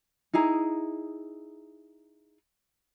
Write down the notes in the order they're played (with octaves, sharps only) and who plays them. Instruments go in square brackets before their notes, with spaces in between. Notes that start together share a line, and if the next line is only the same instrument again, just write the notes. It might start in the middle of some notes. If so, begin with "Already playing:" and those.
[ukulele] D#4 E4 G#4 A#5